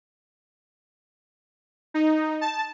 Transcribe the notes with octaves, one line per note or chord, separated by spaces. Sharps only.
D#4
A5